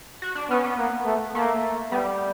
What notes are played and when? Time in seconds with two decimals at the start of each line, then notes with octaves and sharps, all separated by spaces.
0.22 F#4
0.35 D4
0.50 B3 C#4
0.64 B3
0.78 A#3
1.06 A3
1.35 A3 A#3
1.91 G3 B3